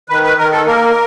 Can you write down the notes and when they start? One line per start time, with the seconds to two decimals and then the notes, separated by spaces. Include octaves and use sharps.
0.09 D#3 B4
0.23 B4
0.38 D#3 A#4
0.52 A4
0.67 A#3 A#4